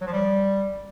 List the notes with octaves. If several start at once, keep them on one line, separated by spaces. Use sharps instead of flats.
F#3
F3
G3